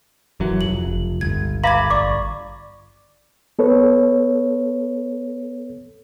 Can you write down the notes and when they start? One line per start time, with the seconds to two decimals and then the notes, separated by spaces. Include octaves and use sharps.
0.40 D1 F#2 E3 F#3
0.61 F1 F2 F#7
0.87 F#1
1.21 G1 C#2 G#6
1.64 E5 F5 A#5 B5 D6 G#6
1.90 A1 D5 C#6 D6
3.59 B3 A4 B4 C#5